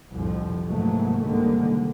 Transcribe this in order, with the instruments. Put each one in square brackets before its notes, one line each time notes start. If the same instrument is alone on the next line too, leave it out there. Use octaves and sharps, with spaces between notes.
[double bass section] C2 F2 A2 D3 F3
G#2 C3 E3 F#3 A3 A#3
C2 G#2 D3 D#3 A#3